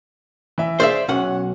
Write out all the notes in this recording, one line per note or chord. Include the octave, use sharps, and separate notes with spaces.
E3 E5
G#4 C5 D5 E5 F5
B1 C#4 F#5